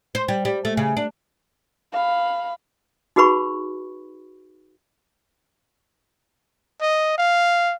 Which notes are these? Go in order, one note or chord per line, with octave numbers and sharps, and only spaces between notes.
C5
G3
G3
A3
C#3
D4
F5 B5
D#4 F#4 G#4 B4 B5 C#6
D#5
F5